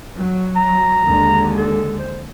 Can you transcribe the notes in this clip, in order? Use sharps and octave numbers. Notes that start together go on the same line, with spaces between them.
F#3
A#5
D#2 D3 G#3
A4
C5